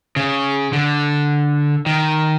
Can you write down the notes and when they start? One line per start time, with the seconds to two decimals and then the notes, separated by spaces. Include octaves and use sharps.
0.16 C#3
0.73 D3
1.86 D#3